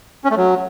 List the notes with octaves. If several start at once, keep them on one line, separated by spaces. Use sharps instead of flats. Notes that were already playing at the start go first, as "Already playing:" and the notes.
C#4
A3
F#3